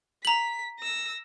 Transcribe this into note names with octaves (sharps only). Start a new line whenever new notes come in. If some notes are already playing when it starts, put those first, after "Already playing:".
A#5 B6 F#7
E6 A#6